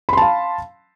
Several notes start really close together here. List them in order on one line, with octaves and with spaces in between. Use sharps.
B5 C6 A5 F5